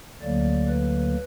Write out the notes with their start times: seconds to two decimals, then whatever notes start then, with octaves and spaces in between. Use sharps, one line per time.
0.21 D2 D3 F#3 A#3 D5
0.69 B4